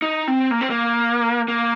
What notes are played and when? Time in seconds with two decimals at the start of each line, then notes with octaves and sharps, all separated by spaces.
0.02 D#4
0.28 C4
0.51 A#3
0.61 C4
0.70 A#3
1.48 A#3